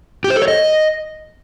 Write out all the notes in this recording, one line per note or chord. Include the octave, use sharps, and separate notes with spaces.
G4
C5
A4
C#5
D#5